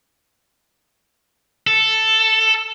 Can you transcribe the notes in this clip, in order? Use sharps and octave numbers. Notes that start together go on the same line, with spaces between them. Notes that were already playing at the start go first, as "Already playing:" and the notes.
A4